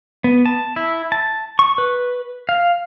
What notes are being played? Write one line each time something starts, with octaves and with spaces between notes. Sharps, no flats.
B3
A5
E4
A5
C#6
B4
F5